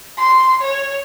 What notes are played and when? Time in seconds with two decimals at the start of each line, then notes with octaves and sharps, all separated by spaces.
0.18 C6
0.62 C#5